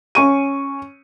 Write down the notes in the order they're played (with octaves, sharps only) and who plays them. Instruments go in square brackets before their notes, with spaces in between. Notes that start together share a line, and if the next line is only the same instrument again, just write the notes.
[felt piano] C#4 C#6 D#7